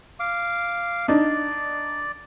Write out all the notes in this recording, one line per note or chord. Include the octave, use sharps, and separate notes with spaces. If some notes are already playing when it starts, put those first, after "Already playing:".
F5 D6
D4 D#4 D5